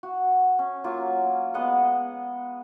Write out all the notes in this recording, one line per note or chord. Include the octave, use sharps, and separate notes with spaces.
F#4
C#4
F#3 A#3 F4
G#3 B3 D#5 F#5